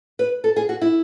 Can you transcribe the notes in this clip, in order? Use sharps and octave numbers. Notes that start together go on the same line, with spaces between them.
B4
A4
G#4
F#4
E4